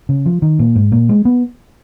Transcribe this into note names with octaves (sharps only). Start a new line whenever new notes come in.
C#3
F3
D#3
A#2
G#2
A#2
G#3
B3